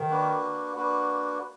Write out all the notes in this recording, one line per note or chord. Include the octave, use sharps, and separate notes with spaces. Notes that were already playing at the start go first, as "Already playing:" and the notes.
Already playing: D#3
A#3 D4 F#4 B4
A#3 D4 F#4 B4